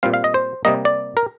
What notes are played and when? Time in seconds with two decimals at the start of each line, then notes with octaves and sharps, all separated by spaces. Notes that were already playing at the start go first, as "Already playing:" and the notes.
0.03 A#2 G3 C4 F5
0.14 F5
0.24 D#5
0.34 C5
0.65 C3 G3 A#3 D#5
0.85 D5
1.17 A#4